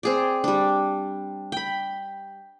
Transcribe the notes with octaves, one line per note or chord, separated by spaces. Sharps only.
C4 G#4 D5
G3 D4
G5 B5